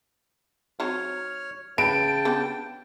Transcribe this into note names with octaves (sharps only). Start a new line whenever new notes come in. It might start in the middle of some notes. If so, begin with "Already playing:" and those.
F#3 C4 D#4 C#5 F6
C#3 B4 G5 A5 D7
B3 D4 G4